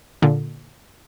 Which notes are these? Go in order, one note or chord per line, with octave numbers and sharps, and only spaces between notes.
A#2 D3